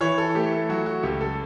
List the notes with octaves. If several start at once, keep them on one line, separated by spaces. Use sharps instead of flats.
E3 C#5
A4
A3 G4
A4
F#3 F#4
F#4
C#2 G4
A4